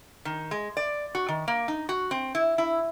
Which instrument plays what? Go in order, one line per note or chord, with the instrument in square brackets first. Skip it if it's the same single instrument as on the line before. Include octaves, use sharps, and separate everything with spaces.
[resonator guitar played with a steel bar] D#3
G#3
D5
F#4
D#3
A#3
D#4
F#4
C4
E4
E4